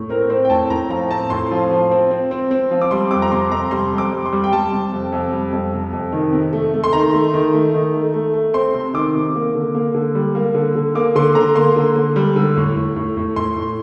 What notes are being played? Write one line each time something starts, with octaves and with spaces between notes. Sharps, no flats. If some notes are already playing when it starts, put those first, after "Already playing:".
Already playing: A2
C4 A#4
C4 C5
G5
A2 A5
A2 A#5
F3 A#5
C4 A5
A2 C6
F3
F3
C4
C4
C4
C4
F3
D6
G3 C6
F2 D6
A#5
C3 C6
F2 A#5
G3 C6
F2
D6
G3
C6
G3
G5
G3 A5
C3
F2
F2
G3
F2
C3
F2
D#3
C3
A3
A3
C6
D#3 A#5
A3
D#3
A3
D#3
A3
A3
A3
C4 C6
C3
D#3 D6
C3
A#3
D3
A#3
D3
G3
A#3
D3
D3
A#3 D6
D3 C6
D3 A#5
A#3 C6
D3
D3
G3
D3
A2
A2
A2
A2
A2 C6
A2